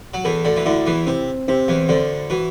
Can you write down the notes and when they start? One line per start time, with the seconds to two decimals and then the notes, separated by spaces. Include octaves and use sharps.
0.14 F#3
0.24 E2 E3 A4
0.45 D2 D3
0.56 E3
0.65 D2 D3 E4
0.86 E2 E3
1.07 C3 C4
1.48 C3 C4
1.68 E2 E3
1.89 D2 D3 C5
2.30 E3 F#4